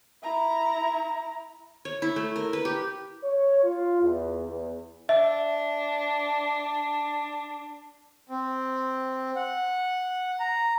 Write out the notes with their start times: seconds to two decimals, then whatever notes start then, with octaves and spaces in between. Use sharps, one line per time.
0.23 E4 A#5
1.85 C#5
2.02 E4
2.16 A3
2.36 A#4
2.53 B4
2.65 G4
3.24 C#5
3.64 F4
4.02 E2
4.47 E2
5.09 D4 E5
8.29 C4
9.36 F#5
10.40 A#5